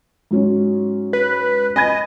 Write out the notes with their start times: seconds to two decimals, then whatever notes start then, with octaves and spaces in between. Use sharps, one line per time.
0.31 G#2 F#3 C#4
1.13 B4
1.76 D#5 G#5 B5 G#6